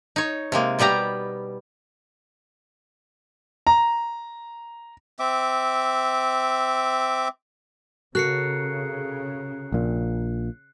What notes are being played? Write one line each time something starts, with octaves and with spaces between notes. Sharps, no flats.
D#4 C#5
C3 G#3 A#3
B2 G3 B3 G4 A#5
A#5
C4 E5 D6
C#3 F#4 A4 A#4 F#6 C7 C#7
A#1 A#2